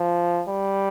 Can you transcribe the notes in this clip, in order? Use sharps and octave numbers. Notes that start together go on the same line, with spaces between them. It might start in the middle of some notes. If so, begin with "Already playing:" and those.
Already playing: F3
G3